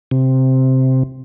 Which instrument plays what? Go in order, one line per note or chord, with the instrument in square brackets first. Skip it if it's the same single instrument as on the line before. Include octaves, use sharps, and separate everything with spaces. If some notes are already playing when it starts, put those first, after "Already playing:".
[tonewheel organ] C3